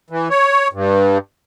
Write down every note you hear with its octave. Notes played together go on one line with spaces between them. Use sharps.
E3
C#5
G2